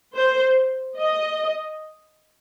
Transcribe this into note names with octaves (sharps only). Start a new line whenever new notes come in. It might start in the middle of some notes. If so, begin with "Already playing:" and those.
C5
D#5